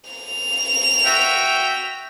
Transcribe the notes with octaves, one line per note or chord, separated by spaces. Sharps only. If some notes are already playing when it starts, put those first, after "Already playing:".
F7
F#4 E5 G5